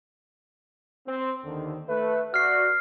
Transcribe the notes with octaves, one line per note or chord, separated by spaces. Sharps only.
C4
D#2 D3 D#3
A3 B4 E5
F#4 D5 F6 C7